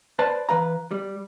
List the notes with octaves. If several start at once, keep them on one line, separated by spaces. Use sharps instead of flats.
B4 C5 D5 A5
E3 B4 F5 A#5
G3